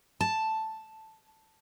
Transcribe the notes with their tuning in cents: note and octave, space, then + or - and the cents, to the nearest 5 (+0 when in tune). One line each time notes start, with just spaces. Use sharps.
A5 +0